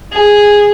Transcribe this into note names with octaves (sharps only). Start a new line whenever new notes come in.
G#4